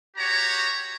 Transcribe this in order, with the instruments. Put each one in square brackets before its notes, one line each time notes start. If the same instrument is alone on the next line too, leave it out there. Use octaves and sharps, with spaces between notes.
[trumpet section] F#4 G4 C#5 A#5